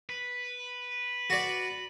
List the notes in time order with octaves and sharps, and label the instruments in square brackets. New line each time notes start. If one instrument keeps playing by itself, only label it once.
[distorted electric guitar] B4
[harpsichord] F#4 D5